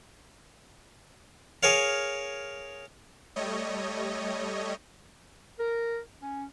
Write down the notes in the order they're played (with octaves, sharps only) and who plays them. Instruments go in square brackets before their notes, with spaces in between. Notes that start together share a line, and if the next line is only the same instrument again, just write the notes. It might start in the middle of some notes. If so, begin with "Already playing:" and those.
[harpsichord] G#4 A#4 C#5 F5
[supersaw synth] G3 A3 C#5 D#5
[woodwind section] A#4
C#4